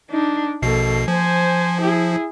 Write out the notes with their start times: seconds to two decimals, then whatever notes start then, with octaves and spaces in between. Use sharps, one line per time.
0.10 D4 D#4
0.62 A#1 B2 A#3 A4 C7
1.08 F3 C5 G#5
1.81 E4 G#4